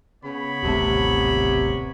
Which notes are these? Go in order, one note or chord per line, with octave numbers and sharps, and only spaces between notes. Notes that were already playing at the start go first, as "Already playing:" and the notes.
C#3 B3 C#5 B5
D#1 A1 C3 A3